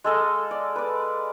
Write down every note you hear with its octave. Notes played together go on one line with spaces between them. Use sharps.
G#3 A4 D#5 F5
D5
B4 D5